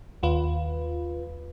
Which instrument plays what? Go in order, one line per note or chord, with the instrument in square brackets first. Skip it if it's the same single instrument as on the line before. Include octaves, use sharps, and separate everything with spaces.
[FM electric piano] D#2 F4 B4